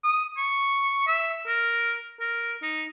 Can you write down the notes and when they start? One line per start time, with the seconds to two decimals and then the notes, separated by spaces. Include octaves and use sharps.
0.04 D#6
0.37 C#6
1.07 E5
1.47 A#4
2.20 A#4
2.62 D#4